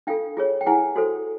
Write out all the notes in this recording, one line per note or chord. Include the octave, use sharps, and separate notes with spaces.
D4 F4 A4 F5 G5
F4 G#4 C#5
G5
E4 G#4 B4 F#5 G#5
F#4 A4 C5